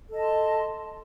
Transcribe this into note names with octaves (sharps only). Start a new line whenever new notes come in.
A4 D#5 A5 C6